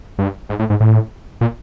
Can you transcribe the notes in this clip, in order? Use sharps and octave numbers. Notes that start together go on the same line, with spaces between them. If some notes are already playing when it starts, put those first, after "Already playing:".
G2
G#2
A2
G#2
A2
A#2